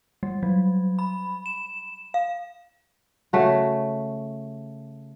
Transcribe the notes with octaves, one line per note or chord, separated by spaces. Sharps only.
G3
F#3
B5
E7
F5
C#3 A3 F#4